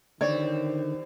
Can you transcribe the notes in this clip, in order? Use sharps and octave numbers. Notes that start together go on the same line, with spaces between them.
E2 D3 D#3 G3 C4 C#5 D5